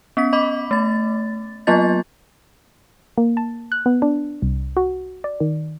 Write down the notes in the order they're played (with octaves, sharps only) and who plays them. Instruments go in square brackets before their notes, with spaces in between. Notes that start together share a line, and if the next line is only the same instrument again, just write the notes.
[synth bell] B3 C#4 B6
D#5 B5 D6
A3 A6
F#3 A#3 B3 F4 D#5 A6
[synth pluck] A#3
A5
F#6
B3
D4
C2
F#4
D5
D#3